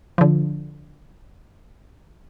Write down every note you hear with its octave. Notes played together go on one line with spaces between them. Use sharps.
D3 F3